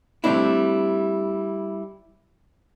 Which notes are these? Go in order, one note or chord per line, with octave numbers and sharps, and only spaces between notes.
G3 A3 A#3 C4 D4 E4